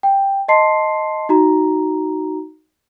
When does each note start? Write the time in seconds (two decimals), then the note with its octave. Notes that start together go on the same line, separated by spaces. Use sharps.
0.03 G5
0.48 D#5 A5 C6 C7
1.29 D#4 F#4 A#5